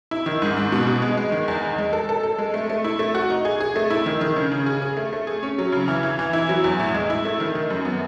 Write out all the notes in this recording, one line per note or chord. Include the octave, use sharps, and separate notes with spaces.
E4
D#3
G#2
G#2
B2
B2
G#3
G#3
D#3
E2
D#4
G#3
A4
A4
A4
G#3
A3
A3
E4
A3
F#4
D#4
G#4
G#4
A3
E4
D#3
D#3
C#3
C#3
G#4
G#4
A3
A3
G#4
C#4
F#3
C#3
E3
E3
E3
E4
F#3
E2
A2
G#3
E4
A3
D#3
D#3
F#2
B3